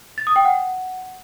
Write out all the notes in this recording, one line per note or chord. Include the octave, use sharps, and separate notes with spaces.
A6
D#6
G5
F#5